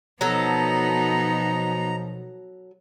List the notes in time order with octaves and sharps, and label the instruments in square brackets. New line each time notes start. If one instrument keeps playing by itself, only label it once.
[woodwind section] B2 F3 [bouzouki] F#3 A4 [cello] B3 D#4 [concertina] A#5